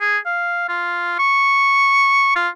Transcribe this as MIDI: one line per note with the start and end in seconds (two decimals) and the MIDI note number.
0.01 0.18 68
0.26 0.65 77
0.69 1.18 65
1.19 2.35 85
2.36 2.49 65